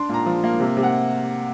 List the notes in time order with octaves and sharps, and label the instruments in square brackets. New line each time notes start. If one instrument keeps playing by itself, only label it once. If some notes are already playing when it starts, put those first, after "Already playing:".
Already playing: [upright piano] D4 C6
A#2 A#5
F3
A#3
C3
C3
F#5